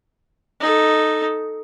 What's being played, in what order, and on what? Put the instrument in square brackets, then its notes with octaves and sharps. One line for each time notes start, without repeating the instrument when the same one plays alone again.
[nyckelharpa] D#4 A4